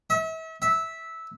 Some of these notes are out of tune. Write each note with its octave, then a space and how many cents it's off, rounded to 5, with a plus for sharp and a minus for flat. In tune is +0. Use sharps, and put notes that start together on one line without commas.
E5 -35
E5 -10